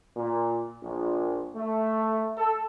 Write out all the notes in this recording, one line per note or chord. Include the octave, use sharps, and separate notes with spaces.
A#2
A#1
A3
A4